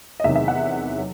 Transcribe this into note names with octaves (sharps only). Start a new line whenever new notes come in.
D#5
E2 C3 D#3 F#3 E5
E5
F#5
F#3